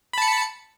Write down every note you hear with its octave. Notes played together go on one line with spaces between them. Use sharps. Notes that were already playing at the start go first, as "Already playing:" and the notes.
A5 B5 C#7